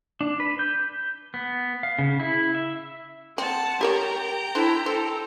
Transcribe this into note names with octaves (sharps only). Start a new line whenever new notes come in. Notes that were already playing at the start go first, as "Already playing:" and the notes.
D4
B4
G6
B3
F5
C#3
E4
E5
C4 F#5 A5
G4 A#4 C#5 G5 A#5
D4 E4 A4 C5
A4 C5